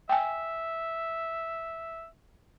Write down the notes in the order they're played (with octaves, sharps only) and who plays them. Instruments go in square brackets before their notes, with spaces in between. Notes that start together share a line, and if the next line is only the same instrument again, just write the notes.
[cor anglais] E5 [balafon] G5 G#5